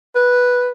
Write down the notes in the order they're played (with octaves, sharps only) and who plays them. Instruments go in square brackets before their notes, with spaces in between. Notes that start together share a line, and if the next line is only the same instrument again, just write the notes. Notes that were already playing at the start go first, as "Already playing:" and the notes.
[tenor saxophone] B4